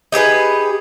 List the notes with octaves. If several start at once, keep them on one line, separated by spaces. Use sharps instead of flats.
D#4 G4 G#4 B4